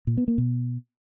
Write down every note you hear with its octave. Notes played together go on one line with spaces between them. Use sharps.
A#2
B3
A#3
B2